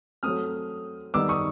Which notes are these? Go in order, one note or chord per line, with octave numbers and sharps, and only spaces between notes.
F#3 A3 C4 D#6 F6
D#3 G3 B3 D#4 D6 E6
C#6 D#6